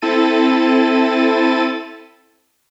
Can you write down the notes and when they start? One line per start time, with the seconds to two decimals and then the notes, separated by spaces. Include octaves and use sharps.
0.02 C4 E4 A4 A6 D#7